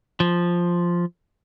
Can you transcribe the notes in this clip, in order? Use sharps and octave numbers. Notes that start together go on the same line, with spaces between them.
F3